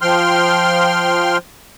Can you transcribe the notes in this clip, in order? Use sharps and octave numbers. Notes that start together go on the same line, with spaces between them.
F3 G5 C6 F6